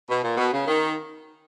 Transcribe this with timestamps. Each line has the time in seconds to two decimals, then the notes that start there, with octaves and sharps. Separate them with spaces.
0.09 B2
0.23 A#2
0.37 B2
0.53 C#3
0.67 D#3